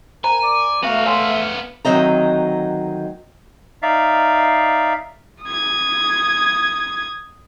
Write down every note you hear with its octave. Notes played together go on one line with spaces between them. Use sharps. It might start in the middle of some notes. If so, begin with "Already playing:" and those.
A#4 C5 G#5 A#5 B5
D5
A3 B3 F#4 F5
C#5 E5 G#5 C6
D2 D#3 F#3 C4 D#5 A#5
D#4 D5 E5 F5
D#6 G#6